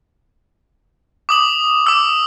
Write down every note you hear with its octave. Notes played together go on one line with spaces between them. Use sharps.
D6 D#6 F#7
D6 E6